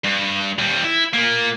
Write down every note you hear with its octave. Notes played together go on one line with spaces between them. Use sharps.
G2
D#2 G3
E4
A#2 A#3